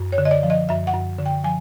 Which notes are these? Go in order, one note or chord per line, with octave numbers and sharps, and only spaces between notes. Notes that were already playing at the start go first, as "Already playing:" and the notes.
Already playing: F#2
C#5
D3
D#5
D5
F3
D#5
F#2 E5
F#5
F#2
D3
G5
F3 G#5